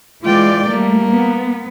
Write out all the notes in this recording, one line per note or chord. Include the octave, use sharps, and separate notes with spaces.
E3 G#3 F4 D5 G5
G3 A3 A#3
B3